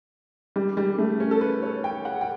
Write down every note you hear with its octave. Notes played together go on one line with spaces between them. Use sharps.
G3
G3
A3
C#4
A4
B4
C#5
G5
F#5
G5